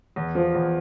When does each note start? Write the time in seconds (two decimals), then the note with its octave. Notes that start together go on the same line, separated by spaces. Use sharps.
0.16 E2
0.35 F3
0.55 E2